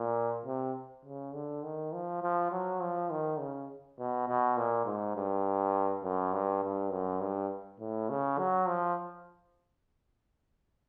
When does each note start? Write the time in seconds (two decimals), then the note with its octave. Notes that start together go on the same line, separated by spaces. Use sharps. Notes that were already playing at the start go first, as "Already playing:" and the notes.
Already playing: A#2
0.46 C3
1.05 C#3
1.34 D3
1.64 D#3
1.93 F3
2.23 F3
2.52 F#3
2.82 F3
3.11 D#3
3.40 C#3
3.99 B2
4.28 B2
4.57 A#2
4.86 G#2
5.16 G2
6.04 F#2
6.33 G2
6.63 G2
6.91 F#2
7.21 G2
7.80 A2
8.10 C#3
8.39 F#3
8.68 F3